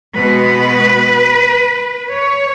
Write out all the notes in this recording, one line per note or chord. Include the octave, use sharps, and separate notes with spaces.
B2 G#3 B3 B4
C#5